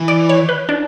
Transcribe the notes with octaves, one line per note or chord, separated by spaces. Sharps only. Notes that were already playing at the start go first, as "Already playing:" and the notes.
Already playing: E3
D5
C#5
B4
D4